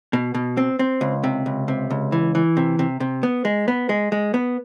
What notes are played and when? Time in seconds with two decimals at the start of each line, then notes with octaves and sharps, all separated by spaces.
0.13 B2
0.34 B2
0.57 C4
0.79 C4
1.01 C#2
1.24 C3
1.46 C#2
1.68 C3
1.90 C#2
2.12 E3
2.35 E3
2.57 C3
2.79 C3
3.00 C3
3.23 B3
3.45 G#3
3.68 B3
3.89 G#3
4.12 G#3
4.34 B3